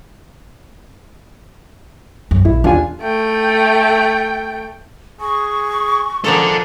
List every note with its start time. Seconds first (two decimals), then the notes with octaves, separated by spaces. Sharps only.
2.31 F#2
2.45 A#1 E4
2.64 E2 D4 F4 G#5
3.02 A3 G5
5.21 G#4 C#6
6.24 F3 G#3 A#3 F4 A4 F#5